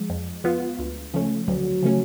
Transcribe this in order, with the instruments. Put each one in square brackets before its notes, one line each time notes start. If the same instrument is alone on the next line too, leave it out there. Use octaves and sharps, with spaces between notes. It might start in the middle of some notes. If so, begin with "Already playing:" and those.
Already playing: [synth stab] F3 [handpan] G#3
[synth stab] F2
F3 B3 F4
D2
C#3 F3 A3 C#4
[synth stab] D2 [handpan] F#3
[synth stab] C#3 F3 A3 C#4